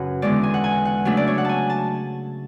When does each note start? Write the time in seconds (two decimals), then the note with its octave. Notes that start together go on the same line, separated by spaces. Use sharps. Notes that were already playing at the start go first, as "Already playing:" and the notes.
Already playing: F#2 C#3 B4 F#5 G#5
0.22 E2 D3 G#3 C#4 D5
0.43 G#5
0.54 F#5
0.64 G#5
0.85 F#5
1.05 C#3 F#3 A3 D4 E5
1.17 D5
1.27 C#5
1.38 F#5
1.45 G#5 A5
1.70 A5